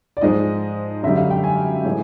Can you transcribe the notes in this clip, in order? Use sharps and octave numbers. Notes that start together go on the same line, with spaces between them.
D5
G#2 F3 G#3 D#5
F#2 D3 G3 E5
F5
G5
G#5
A2 E3 G#3